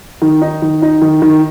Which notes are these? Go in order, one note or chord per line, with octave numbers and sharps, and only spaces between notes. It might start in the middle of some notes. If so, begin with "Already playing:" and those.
D#3
D#4
D#3
D#4
D#3
D#3